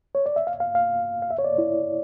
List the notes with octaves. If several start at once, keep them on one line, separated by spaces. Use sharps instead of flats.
C#5
D5
E5
F5
F5
F5
F5
E5
C#5
D5
E4